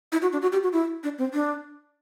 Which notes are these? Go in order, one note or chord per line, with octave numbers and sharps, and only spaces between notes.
E4
F#4
D4
F#4
G4
F#4
E4
D4
C4
D4